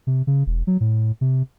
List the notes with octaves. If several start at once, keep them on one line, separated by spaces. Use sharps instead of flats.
C3
C#3
E1
F#3
A2
C3